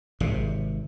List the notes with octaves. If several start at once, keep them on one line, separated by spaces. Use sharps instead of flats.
G#1 C3